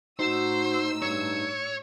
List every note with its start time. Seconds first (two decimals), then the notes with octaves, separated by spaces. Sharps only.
0.20 A2 D#4 F#4 C5 E6
1.02 G2 C#5